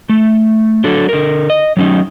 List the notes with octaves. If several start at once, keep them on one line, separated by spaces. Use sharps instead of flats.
A3
F#3 D4 A4
D3 A#4
D#5
F#3 C#4 D#4